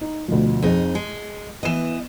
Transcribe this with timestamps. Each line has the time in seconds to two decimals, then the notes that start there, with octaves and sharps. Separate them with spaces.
0.01 D#4
0.28 D2 B2 F3
0.62 F2 D#4 G#4
0.95 G#3
1.63 E3 B3 D#5 E7